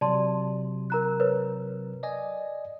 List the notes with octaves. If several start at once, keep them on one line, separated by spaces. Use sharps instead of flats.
C3 F#3 D5 A5 C6
A#4 A#5 F#6
A#4 B4 C#5
D5 D#5 G#5